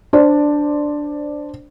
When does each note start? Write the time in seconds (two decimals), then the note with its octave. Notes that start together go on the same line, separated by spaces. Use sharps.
0.13 D4 C5 D5